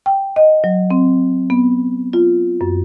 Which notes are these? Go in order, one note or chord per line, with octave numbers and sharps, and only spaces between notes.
G5
D#5
F#3
C4
B3
F4
F#2